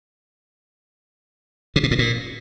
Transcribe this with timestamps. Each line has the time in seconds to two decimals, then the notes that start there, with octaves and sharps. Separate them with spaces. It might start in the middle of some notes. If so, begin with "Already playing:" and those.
1.76 C3
1.83 B2
1.91 A2
1.99 A#2